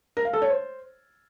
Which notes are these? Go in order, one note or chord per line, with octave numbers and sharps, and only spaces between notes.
A#4
F5
A4
C#5
C5